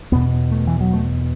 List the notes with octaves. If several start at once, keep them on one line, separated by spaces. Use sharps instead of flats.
E2 B2 B3
A3
E3
F#3
A3